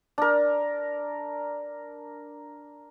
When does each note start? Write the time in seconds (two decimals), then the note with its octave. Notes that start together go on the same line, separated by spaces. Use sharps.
0.18 D4 A#4